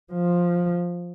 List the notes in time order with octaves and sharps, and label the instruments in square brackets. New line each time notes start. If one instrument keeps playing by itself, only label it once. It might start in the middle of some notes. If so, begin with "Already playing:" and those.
[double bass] F3